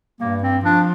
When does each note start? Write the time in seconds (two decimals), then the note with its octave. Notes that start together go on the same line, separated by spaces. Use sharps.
0.20 G2 A#3
0.43 C4
0.64 F3 D4